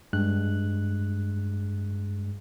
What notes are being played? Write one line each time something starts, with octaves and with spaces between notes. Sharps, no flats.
G2 G#3 F#6